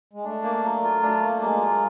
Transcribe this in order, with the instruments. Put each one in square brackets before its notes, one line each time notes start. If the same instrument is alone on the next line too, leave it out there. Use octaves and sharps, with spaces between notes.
[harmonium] G#3
[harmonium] A3 [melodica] D4
[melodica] A#3
F#3
F4
[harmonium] A3 [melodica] D4
[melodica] A#3
[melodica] F#3 [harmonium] G#3
[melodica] F4